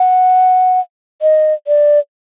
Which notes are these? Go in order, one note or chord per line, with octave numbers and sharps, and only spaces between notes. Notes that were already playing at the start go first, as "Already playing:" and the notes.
Already playing: F#5
D#5
D5